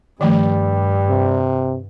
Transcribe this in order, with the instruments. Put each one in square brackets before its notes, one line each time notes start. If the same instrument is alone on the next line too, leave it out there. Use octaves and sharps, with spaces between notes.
[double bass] G2 [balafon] D#3 F3 A3 [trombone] G3
[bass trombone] C3